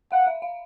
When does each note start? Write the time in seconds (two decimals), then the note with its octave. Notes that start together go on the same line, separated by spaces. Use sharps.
0.12 F5 F#5
0.27 E5
0.42 F5